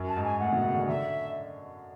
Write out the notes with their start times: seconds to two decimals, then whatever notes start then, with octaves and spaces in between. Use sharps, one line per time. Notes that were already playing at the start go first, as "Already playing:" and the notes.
Already playing: F#2
0.09 A5
0.17 G#2
0.24 G#5
0.40 A2 F#5
0.52 B2
0.64 C#3
0.75 D3
0.87 D3 E5